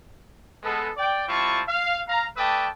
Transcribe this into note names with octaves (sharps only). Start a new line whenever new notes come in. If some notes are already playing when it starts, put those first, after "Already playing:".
G#3 B3 A4
D5 G5
G3 C4 E4 F4 A5 C#6
F5
F5 A#5
A3 B4 D5 G5 A5 D#6